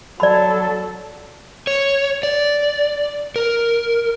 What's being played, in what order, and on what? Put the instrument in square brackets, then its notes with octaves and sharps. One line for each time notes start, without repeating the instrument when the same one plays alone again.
[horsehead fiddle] F#3 A4 [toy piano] D5 B5
[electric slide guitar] C#5
D5
A#4